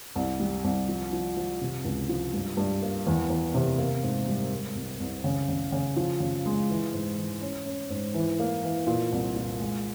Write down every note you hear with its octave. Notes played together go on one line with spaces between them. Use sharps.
C2
G3
C2
F3
F3
F3
C3
C#2
F3
G2
G2
A#3
E2
E2
C3
A#3
G#2
G3
G#3
C2
C2
C#3
C#3
C#3
F3
C#3
G#3
E3
G#2
E3
C#4
C#4
G#2
E3
A#3
E3
A#2
C2
A#2
G#3